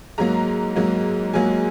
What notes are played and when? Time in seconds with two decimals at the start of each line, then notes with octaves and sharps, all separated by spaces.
0.18 G#2 F#3 A#3 A#5
0.76 G#2 F#3 A#3
1.33 G#2 F#3 A#3 G#5